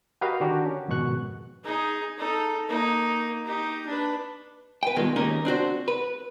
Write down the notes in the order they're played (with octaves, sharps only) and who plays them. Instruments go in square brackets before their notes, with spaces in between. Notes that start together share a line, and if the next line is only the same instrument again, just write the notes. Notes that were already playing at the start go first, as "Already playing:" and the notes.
[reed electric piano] F#4 G4 A#4 B4 D#5 F5
D3 D#3 D4 F#4 G4 A#4
C#4
F2 G#2 B2 D#3 C#6 F#6
[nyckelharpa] D#4 G#4
D#4 A4
A#3 D#4
D#4 G4
D4 B4
[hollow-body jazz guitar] B4 G5
G2 B2 D#3 G#3 F4
D#2 A#3 C#4 D#4 A#4
C4 D4 F#4 C5
B4